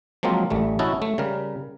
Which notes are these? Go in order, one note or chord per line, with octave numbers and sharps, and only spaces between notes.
F3 F#3 G#3 A#3 C4 F4
A1 G3 A3
C#4 E4 F#4 D#5 A5
A3
C#3 G3 A#4